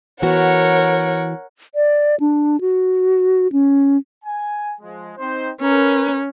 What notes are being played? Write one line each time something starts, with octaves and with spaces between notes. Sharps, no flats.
E3 B3 F#4 A#4 C#5 F#5
D5
D4
F#4
C#4
G#5
F3 G#3
C4 D#4 C5
C#4 A#4 B4